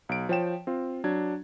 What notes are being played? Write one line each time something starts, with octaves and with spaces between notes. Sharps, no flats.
B1 D7
F3 C#5 G5 E7
C4 F4
F#3 D4 G#6